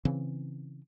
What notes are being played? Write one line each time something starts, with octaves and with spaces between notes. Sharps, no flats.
C#3 E3 C4